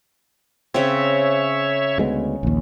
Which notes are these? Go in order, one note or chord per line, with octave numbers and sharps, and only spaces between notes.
C#3 C4 C#5 E5
D2 G#3 B3
A#1 D#2